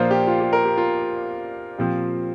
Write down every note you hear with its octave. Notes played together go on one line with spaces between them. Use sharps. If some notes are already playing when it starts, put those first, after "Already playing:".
Already playing: A#2 F3 A#3 D4 F4 C5 F5
G4
F4
G4
A#4
G4
F4
A#2 F3 C4 F4 G4